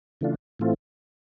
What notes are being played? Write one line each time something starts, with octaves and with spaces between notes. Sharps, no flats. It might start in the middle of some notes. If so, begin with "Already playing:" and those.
C#3 E3 A3 D4 F4
A2 E3 A3 C4 F4